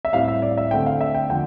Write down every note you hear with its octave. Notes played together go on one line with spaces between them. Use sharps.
E5
A2 G3 C4 F5
E5
D5
E5
D3 A3 C4 G5
F5
E5
G5
D3 F3 A3 G5